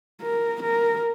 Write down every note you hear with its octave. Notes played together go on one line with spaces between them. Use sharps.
A#4
A#4